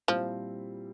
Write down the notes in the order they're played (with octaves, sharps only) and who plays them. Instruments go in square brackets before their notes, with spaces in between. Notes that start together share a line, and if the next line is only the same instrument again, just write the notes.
[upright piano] A#2 G3 C4 E4 [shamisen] F3